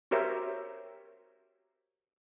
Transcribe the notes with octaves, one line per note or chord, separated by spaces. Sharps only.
F#4 G4 A#4 C5 C#5 E5